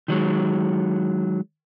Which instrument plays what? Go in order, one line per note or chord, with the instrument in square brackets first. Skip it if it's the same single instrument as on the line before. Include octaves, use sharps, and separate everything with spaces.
[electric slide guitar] D#3 F#3 G#3